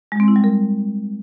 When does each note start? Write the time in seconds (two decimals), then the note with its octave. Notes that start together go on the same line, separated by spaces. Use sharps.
0.12 G#3
0.20 C4
0.28 E4
0.36 G3
0.44 A#4